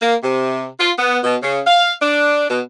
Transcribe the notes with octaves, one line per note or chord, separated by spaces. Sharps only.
A#3
C3
F4
B3
B2
C#3
F5
D4
B2